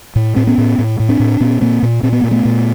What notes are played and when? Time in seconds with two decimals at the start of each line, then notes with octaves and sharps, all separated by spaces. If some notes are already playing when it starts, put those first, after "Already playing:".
0.16 A2
0.36 A2 C4
0.47 B3 C#4
0.58 A2
0.79 A2
1.00 A2
1.09 C4 D4
1.20 A2
1.40 A#2 B3 C#4
1.61 A#2 A#3 C4
1.83 A#2
2.03 A#2 C4
2.13 B3
2.21 A#2 A#3
2.31 A3 B3
2.45 A#2